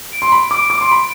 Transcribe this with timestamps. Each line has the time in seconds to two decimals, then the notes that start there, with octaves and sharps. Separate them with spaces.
0.13 D7
0.22 C6
0.32 B5
0.51 D6
0.70 D6
0.81 C6
0.91 B5